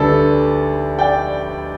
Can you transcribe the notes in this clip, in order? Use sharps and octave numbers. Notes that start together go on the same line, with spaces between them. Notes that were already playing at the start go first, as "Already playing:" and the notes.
Already playing: D2 D3 G3 A4 B4 D5
D5 G5